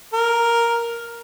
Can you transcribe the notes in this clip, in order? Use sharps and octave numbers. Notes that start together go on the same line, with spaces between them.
A#4